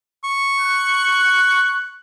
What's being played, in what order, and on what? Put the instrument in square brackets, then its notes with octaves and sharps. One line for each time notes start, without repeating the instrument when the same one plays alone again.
[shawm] C#6
[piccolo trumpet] F#6